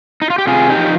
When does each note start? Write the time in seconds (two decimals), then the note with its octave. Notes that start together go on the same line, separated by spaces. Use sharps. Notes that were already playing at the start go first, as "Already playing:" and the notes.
0.22 D#4
0.30 F4
0.38 G4
0.47 C3 F4 G#4
0.70 D#4 G4
0.77 F3